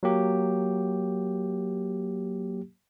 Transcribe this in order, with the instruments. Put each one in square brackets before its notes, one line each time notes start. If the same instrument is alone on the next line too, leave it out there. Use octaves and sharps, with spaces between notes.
[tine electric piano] F#3 A#3 G4